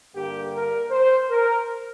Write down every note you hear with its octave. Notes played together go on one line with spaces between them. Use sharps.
G2 D3 A#3 G4
A#4
C5
A#4